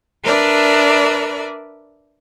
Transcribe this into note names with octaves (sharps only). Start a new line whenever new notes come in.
D4 A#4 B4 D5 E5